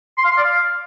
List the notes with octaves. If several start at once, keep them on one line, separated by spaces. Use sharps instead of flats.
C6
F5
C6
D5
F5